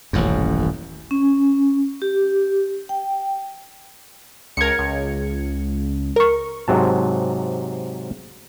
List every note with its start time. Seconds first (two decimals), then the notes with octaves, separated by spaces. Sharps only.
0.13 D#1 A1 F#2
1.11 C#4
2.02 G4
2.89 G5
4.57 C#2 A#4 G#6 C#7
4.78 C#2
6.16 A#4 C#6
6.68 G#2 C3 F#3 A5